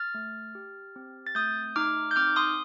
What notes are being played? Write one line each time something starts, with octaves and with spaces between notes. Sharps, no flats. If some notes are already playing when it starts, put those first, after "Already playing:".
Already playing: F6 A6
A3
G4
C4
A6
A3 D#6 G6
D#4 D6 F6
G6
C4 D6 F6
C6 D#6